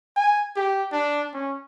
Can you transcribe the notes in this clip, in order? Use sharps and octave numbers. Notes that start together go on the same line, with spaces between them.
G#5
G4
D4
C#4